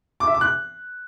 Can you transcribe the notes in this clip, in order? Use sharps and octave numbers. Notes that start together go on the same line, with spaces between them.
D6
E5
D6
F#6